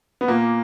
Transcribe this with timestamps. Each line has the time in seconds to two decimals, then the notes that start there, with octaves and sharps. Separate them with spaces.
0.21 B3
0.28 A#2 A#3